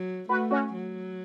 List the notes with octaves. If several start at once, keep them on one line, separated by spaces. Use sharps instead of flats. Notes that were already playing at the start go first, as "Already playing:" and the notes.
Already playing: F#3
A3 F#4 B4
C#4 F#4
F#3